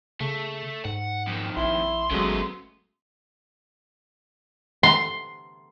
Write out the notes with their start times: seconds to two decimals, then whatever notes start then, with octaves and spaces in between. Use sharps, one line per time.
0.21 C#3 A3
0.85 G#2 F#5
1.27 F2 D#3
1.57 A#1 E4 E5 C6
2.11 G#1 C#3 F#3 G#3 A3 B3
4.83 C6